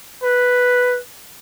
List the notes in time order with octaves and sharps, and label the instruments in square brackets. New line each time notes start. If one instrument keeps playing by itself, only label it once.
[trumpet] B4